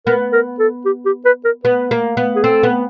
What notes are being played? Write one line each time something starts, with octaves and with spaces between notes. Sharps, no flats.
B3 A#4
A#4
A4
G4
G4
B4
A#4
B3 B4
A#3
B3
G#4
C4 A4
B3